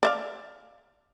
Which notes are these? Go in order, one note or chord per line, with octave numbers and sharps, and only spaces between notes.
D5 E5 F5